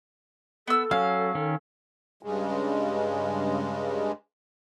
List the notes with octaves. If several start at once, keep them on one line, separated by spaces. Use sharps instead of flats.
B3 A4 E6
F#3 C#4 F5
D#3 C#4
G2 C#3 G#3